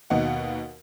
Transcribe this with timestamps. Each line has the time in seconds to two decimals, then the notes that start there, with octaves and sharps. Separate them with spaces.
0.10 D#2 B2 D#4 F#5